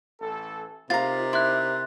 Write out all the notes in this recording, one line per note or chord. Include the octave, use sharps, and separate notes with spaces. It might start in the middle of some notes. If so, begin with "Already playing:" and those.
A1 E3 A4
C3 D#4 F4 A#4 A#5 A6
E4 C6 F#6